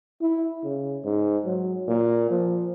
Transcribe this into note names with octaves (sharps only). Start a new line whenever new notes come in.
E4
C#3
G#2
F#3
A#2
F3